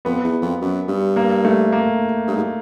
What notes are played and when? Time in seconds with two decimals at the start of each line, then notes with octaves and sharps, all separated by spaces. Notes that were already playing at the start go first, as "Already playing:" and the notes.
0.05 F2 B3
0.24 E2
0.42 F2
0.61 F#2
0.88 G2
1.16 A#3
1.45 A3
1.72 A#3
2.27 G2
2.36 G#2